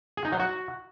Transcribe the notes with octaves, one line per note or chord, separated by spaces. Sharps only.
G#4
D#4
F#3
F#4